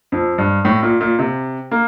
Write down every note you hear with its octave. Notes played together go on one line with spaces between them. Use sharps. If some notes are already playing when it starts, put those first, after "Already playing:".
F2
G2
A2
A#2
A#2
C3
A#3